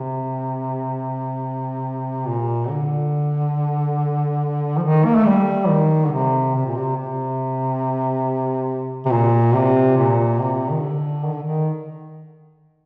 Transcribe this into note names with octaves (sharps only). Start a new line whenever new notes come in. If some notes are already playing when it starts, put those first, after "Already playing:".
Already playing: C3
A#2
D3
F3
D#3
A#3
A3
G3
D#3
D3
C3
C3
A#2
C3
C3
C3
A#2
C3
A#2
C3
D#3
D3
D#3
D3
D#3